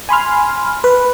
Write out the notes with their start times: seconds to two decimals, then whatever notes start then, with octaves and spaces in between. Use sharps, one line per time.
0.09 G#5 B5 C6 F6
0.84 B4